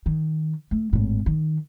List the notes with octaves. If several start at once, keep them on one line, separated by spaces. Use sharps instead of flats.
D#3
A3
G#1 A2
D#3